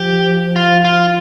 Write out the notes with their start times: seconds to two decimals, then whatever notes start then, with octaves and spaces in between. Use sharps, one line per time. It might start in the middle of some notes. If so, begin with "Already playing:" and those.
Already playing: F3 G4
0.56 F4
0.85 F4